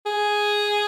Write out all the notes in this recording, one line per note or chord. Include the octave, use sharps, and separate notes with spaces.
G#4